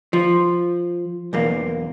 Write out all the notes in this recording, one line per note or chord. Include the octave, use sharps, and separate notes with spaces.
F3
B1 E2 A#3